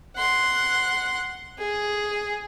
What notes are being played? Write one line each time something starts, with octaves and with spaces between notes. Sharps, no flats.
F#5 C6
G#4